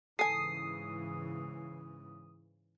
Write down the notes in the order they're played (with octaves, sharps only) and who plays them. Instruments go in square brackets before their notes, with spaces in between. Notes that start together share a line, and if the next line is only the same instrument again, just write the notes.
[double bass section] G#2 C#3 E3 [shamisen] A4 G#5 [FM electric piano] D#6 [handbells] C7